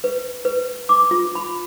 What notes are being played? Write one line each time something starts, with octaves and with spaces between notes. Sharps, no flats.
B4
B4
D6
F4
B5